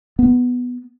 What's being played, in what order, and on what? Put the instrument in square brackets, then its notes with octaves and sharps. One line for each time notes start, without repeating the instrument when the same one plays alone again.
[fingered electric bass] B3